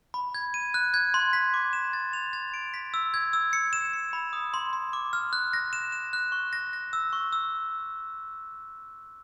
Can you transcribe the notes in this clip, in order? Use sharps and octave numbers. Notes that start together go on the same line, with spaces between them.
B5
G#6
D#7
F#6
G#6
C6
B6
D6
E7
A6
F7
A6
D7
B6
E6
G#6
E6
C#7
E7
C#7
B5
D#6
C6
C6
D6
F6
F#6
A#6
E7
E7
F#6
C#6
A#6
A#6
E6
C#6
E6